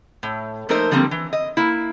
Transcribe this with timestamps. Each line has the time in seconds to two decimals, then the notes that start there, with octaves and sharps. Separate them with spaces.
0.23 A2
0.69 F3 A3 A#3 D#4 A#4 C5
0.91 D3 F3 G3 A#3 C4
1.11 E3
1.33 D#5
1.57 A#3 E4